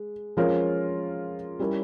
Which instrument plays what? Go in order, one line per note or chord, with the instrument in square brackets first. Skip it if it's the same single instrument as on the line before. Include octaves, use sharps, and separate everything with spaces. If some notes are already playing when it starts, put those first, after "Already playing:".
Already playing: [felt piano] G#3
F3 G#3 C#4 F4 A#4
G3 C#4 E4 A#4 C#5